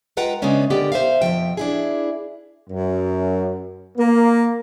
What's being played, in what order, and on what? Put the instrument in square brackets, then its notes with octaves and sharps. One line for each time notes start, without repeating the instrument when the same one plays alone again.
[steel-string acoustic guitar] G#3 F4 B4 F#5 G5 A#5
C#3 G#3 A3 B3 C#4 D4
D3 B3 G4 A#4 D5 G5
C5 E5 F5
F2 B2 F3 G5
D4 E4 G#4
[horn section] F#2
A#3